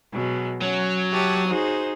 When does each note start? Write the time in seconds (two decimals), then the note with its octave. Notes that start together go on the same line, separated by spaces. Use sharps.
0.12 B2 F#3 G#3
0.61 F#3 C#4
1.12 G4 C#5 E5 A5 D#6
1.47 D#4 F#4 G#4 C5